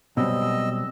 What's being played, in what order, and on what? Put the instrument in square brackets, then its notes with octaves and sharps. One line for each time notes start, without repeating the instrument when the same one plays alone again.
[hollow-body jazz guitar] B2 [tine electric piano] F#3 G3 C4 [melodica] D#5 E6